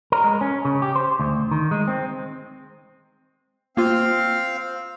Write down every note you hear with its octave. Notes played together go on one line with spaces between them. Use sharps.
A#4
G#3
C#4
C#3
G4
C5
D2
D#3
G#3
C4
A#3 C4 F4 F5